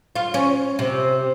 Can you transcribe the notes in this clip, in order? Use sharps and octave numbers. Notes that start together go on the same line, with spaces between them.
F4
C#4
C3